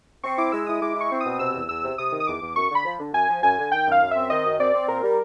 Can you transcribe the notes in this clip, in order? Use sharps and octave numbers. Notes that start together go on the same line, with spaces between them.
C4 C#6
E4 D6
G#3 E6
E4 D#6
G#3 D6
E4
C#6
C4
D#6
B2
C3 E6
E2
E2 E6
C3
C3 D#6
D#3
D#6
E2 D6
E2
F#2 C#6
D3 B5
F3
D3
F#2 G#5
F3
F#2 G#5
D3
D#3 G5
F#2 F5
F#2
C4 E5
D#3 D#5
F#2
C4 D5
C4
A#2 A#4
G3